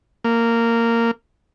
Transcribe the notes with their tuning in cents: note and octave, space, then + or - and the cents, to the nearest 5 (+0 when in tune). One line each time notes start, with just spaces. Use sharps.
A#3 -15